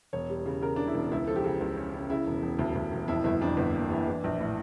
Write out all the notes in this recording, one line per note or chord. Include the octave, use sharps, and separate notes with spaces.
E1 C#5
G3
C#3
C#3 A#4
C#3 D4
E4
E1
C#2 E4
F3 A4
G4
C#3
C#2
C#4
C#4
C#3 E4
E1
E1
D2
D2
E1
F2 E4
G1 E4
F2 D4
G1
A#3
E3
E3
A#1
A2